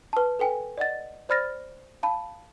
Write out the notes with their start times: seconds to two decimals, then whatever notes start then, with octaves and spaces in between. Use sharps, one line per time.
0.13 B4 A5
0.39 A4 B4 G5 G#5
0.78 D5 D#5 F#5 A6
1.29 C5 D5 B5 F6 A6 A#6
2.03 F5 A5 B5